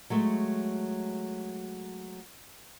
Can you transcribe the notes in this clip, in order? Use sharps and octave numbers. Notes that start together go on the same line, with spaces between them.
F#3 G#3 A3